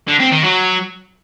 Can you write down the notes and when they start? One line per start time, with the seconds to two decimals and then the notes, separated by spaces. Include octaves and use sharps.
0.08 D3
0.20 C4
0.32 D#3
0.44 F#3